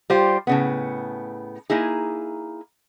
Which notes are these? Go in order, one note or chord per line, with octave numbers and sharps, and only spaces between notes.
G3 F4 G4 C5
A2 C#3 B3
A#3 D#4 E4 G#4